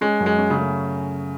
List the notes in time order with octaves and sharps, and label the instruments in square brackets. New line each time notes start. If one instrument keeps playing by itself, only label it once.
[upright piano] G#3 [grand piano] C#4
[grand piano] F#2
[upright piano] G#3
[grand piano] C#4
[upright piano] C#3
[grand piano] A3